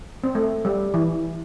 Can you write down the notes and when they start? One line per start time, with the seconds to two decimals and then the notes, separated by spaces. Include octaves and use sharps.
0.24 C4
0.35 A3
0.65 G3
0.94 E3